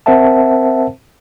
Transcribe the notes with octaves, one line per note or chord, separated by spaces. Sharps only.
C4 A#4 C5 E5 F#5 A5